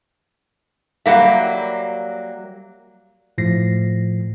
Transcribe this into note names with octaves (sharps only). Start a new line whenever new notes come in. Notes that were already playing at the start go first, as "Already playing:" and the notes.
F#3 G3 A#3 E5
A2 F3 A#6 C7